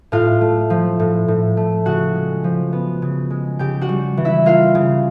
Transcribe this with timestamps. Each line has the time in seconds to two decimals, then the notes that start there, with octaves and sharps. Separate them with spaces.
0.12 A2 F4 F5
0.41 A3
0.70 F3
0.99 A2
1.28 A2
1.57 A3
1.86 C#3 F#4 F#5
2.15 G#3
2.44 F3
2.73 B3
3.02 C#3
3.30 G#3
3.59 C#3 G4 G5
3.81 F#4 F#5
3.89 G3
4.17 E3
4.25 E4 E5
4.46 A#3 F4 F5
4.75 C#3